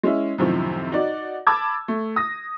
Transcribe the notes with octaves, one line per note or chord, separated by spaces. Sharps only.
G#3 C#4 E4
F#2 A2 C3 D#3 F3
D#4 F#4 D5
A5 B5 D6 E6 G#6
A3
D#6 A#6